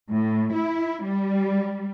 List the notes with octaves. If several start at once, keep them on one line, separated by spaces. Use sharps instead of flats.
A2
E4
G3